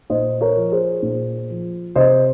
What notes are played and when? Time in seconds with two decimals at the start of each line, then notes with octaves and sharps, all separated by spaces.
0.10 A#2 C5 D#5
0.41 A#4 C#5
0.57 F3
0.72 G#4 C5
1.03 A#2
1.50 F3
1.96 C3 C5 D#5